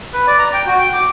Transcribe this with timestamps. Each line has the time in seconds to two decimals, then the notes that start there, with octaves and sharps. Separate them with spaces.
0.13 B4
0.27 D5
0.39 A#5
0.53 G5
0.67 F#4
0.78 G5
0.93 D6